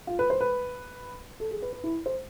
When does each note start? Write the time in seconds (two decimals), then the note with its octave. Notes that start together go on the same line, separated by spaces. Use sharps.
0.07 F4
0.19 B4
0.30 C5
0.41 B4
1.40 A4
1.51 G#4
1.62 B4
1.73 B4
1.84 E4
2.06 C5